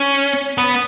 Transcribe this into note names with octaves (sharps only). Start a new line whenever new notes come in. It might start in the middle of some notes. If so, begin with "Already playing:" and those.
Already playing: C#4
B3